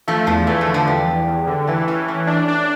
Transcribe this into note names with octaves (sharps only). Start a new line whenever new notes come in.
F3 A3
E2 F3
E3 A3
F3
D3
F3
E2 G3
E2
E2
D3
E3 A3
E3 C#4
E3 C#4
D4
D4